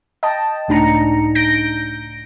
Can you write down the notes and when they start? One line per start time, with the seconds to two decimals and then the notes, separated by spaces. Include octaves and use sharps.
0.23 D#5 G5 A5
0.68 C#2 A2 D4 D#4 A#5 C#7
1.35 G6 A#6 D7